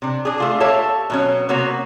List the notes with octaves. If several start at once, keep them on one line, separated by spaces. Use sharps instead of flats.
C3 D4
D4 G#4
A3 F4 G#4
G4 A4 C#5 E5 F5 A5
B2 F#3 C#4
C3 A#3 B3 F#4 C#5